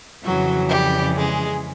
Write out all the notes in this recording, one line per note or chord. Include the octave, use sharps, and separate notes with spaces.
F2 C#3 E3 F#3 F#4
G3 G4
G#3 G#4